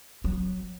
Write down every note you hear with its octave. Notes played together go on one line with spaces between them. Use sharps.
F#3